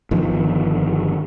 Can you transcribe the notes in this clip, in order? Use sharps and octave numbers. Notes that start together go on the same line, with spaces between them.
G1 D#3 F3